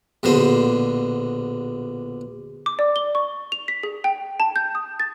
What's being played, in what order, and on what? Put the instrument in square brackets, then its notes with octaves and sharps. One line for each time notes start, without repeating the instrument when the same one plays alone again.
[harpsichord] A#1 B2 D3 C5
[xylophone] D6
D5
G7
C#6
F7
B6
G#4
G5
A5
G6
D#6
A6